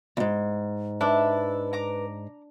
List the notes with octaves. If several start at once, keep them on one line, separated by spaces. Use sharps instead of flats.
E2 G#2
D4 E4 A4 B4
A#5 D6